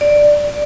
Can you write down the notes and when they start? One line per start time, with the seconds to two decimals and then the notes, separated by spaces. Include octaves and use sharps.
0.01 D5